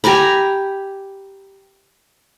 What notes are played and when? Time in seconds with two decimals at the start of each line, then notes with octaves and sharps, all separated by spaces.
0.04 G4 G#5 A#5 B5